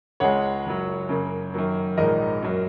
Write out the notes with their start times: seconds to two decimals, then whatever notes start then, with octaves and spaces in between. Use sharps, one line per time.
0.20 C#2 C#3 G#3 C#5 F#5
0.65 F#1 F#2 F#3
1.09 F#2 C#3 A#3
1.54 F#2 D#3 F#3 A#3
1.97 A#1 G#2 D#3 A#4 D#5
2.42 F#2 F#3 A#3